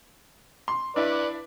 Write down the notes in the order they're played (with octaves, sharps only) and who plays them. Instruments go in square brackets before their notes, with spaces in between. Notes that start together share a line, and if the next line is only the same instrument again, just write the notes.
[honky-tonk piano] C6
[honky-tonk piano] D4 E4 [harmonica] B4 D5